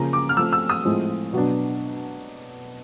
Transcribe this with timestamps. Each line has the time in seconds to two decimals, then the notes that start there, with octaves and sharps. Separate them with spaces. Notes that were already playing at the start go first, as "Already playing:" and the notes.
Already playing: C#3 F3 A#3 A#5
0.13 D6
0.29 F6
0.36 F3 A3 C4 E6
0.53 E6
0.70 D#6
0.85 A2 F3 G#3 C4
1.33 B2 F#3 B3 D4